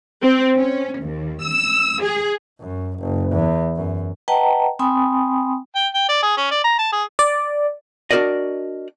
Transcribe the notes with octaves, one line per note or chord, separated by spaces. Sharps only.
C4
C#4
D#2
E6
G#4
F#2
F#1
E2
F#2
B4 D#5 F#5 G5 A5 A#5
C4 G5 G#5 B5 C6 D#6
G5
G5
D5
G#4
C#4
D5
A#5
A5
G#4
D5
D4 F#4 G4 A#4 D5 D#5